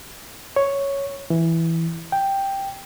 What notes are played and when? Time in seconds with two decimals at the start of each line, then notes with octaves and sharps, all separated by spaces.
0.56 C#5
1.30 E3
2.12 G5